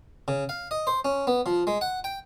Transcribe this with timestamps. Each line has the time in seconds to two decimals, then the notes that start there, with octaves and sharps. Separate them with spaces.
0.28 C#3
0.49 F5
0.71 D#5
0.87 C5
1.05 C#4
1.27 B3
1.46 F3
1.67 G#3
1.81 F#5
2.04 G5